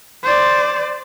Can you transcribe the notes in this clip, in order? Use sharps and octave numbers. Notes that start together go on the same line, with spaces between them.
C5 D5